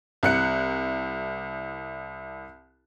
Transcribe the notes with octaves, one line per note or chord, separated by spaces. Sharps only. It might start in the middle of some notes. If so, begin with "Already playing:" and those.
C2 F#6 C#7